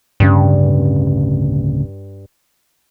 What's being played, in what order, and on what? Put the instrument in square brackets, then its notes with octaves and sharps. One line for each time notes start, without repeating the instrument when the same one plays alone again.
[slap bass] D1 C#3 C#4 [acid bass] G2